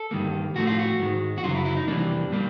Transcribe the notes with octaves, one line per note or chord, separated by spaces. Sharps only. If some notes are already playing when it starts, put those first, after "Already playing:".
Already playing: A4
G2 D#3 G3 A#3
A2 F3 A3 F#4
F4
F#4
G#2 D#3 G#3
F#4
F#2 C#3 F#3 F4
E4
E4
D#4
F2 C3 E3 G3 A#3 D4
A#2 G3 A#3